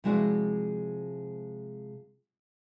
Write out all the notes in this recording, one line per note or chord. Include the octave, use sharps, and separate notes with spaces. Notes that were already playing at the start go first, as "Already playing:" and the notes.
C3 F3 G#3 E4 F#4 D5